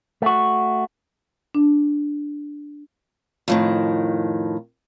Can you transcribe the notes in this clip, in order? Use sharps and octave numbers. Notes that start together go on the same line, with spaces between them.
A3 F#4
D4
F2 A2 D#3